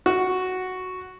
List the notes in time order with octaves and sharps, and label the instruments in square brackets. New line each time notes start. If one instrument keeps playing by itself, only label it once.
[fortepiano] F#4